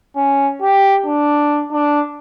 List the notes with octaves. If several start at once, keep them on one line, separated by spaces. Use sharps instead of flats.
C#4
G4
D4
D4